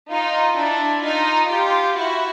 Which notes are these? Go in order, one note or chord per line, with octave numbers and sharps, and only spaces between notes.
D#4 F4
D4 E4
D#4 F4
F4 G4
E4 F#4